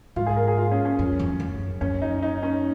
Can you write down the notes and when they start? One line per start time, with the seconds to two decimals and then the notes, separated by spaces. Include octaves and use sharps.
0.16 G#2 F4
0.26 G#4
0.36 A#4
0.48 G#4
0.58 F4
0.71 C#4
0.85 C#4
0.99 F#2
1.19 F2
1.40 F#2
1.81 F#2 C#4
2.02 D#4
2.22 D#4
2.43 C#4